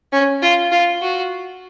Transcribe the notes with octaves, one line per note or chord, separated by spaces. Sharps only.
C#4
F4
F4
F#4